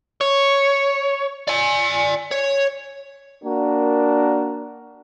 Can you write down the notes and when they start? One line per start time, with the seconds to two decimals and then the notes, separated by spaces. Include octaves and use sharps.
0.21 C#5
1.48 D5 G#5
2.31 C#5
3.43 A#3 D4 F#4 A#4